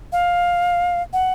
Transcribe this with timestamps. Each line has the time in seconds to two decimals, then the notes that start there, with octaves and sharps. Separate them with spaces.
0.12 F5
1.13 F#5